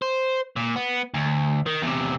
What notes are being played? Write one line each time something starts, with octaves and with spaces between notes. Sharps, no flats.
C5
A#2
B3
D2
D#3
E2 C3